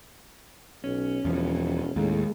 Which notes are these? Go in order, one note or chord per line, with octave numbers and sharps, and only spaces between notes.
B1 C#4
E1 E2 F3
D#2 A2 G#3